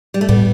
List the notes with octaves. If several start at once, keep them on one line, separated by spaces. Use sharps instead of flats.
G3
A3
A2 G3 B3